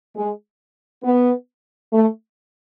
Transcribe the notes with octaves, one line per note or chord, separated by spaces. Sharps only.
G#3
B3
A3